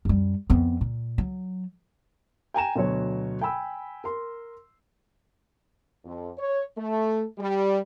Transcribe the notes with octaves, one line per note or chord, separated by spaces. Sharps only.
F#2 G3
F2 B3
A#2
F#3
G5 G#5 A#5 E7
D2 B2 F#3 C#5
G5 G#5 B5 E6
A#4 C6
F2
C#5
A3
G3